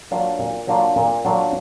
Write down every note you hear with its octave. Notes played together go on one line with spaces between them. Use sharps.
F#3 A#3 D4 F4
A#2
F#3 A#3 D4 F4
A#2
F#3 A#3 D4 F4